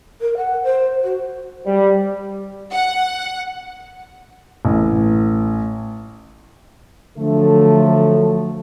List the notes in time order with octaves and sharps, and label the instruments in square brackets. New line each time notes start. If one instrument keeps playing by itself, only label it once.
[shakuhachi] A#4
F#5
C5
F#4
[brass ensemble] G3
[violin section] F#5
[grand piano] A1
[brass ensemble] D3 F3 F#3 A3